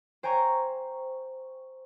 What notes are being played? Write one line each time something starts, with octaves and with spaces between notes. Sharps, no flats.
C5 G5 G#5 A#5 C#6